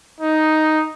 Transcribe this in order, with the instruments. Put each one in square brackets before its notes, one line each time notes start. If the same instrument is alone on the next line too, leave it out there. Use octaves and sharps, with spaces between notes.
[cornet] D#4